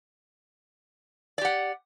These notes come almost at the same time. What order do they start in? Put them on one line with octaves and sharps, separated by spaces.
D5 G4 F#5